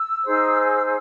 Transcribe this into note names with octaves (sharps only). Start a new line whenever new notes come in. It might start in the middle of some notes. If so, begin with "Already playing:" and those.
Already playing: E6
D#4 G#4 C5